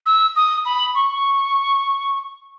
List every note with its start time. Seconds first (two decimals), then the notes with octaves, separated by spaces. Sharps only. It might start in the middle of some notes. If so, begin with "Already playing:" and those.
0.06 E6
0.36 D#6
0.65 B5
0.95 C#6